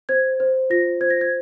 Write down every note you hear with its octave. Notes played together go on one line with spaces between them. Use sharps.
C5 G#6
C5
F4 A#6
C5 G#6
A#6
G#6